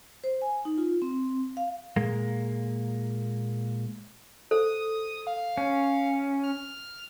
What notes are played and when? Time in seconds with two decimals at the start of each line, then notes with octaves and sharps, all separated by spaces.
0.24 C5
0.42 G#5
0.65 D#4
0.78 F4
1.02 C4
1.57 F5
1.96 A#2 G#3 A#3
4.51 A4 C5 D#6
5.27 F5
5.57 C#4
6.43 F6